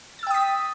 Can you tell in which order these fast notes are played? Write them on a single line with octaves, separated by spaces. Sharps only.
A6 E6 G5 D#6 B6